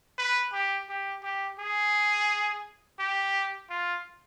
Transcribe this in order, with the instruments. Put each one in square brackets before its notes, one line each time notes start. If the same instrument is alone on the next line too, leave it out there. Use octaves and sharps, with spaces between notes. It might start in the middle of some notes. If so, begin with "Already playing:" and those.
[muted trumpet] B4
G4
G4
G4
G#4
G4
F4